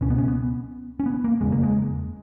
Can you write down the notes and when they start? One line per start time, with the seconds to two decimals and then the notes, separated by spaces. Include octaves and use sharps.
0.01 C#2 B2 C#4
0.10 B3
0.18 C#4
0.28 B3
1.00 C#4
1.06 B3
1.24 A#3
1.41 F#1 E2 C#3 G#3
1.52 A#3
1.63 G#3